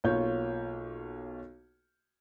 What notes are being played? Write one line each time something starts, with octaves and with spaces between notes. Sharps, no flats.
B1 A#3 F4 C#5 G6